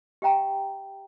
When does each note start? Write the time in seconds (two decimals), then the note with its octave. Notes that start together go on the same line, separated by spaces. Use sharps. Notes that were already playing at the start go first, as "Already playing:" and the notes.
0.22 G4 E5 G5 A#5